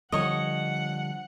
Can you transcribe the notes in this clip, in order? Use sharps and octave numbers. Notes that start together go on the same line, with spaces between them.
D3 F3 G3 C#5 D#5 F#5